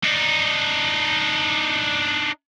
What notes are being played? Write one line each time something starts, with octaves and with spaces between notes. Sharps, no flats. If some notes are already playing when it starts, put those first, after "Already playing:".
D4 D#4